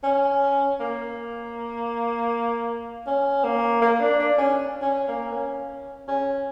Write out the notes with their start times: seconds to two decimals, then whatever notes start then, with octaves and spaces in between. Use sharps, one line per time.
0.03 C#4
0.80 A#3
3.07 C#4
3.44 A#3
3.82 A#3
4.00 D4
4.19 D4
4.38 C#4
4.82 C#4
5.08 A#3
5.33 C#4
6.08 C#4